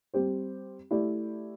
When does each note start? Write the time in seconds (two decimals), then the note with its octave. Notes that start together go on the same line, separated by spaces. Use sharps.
0.14 G3 C4 G4 C5
0.91 A3 E4 G4 D5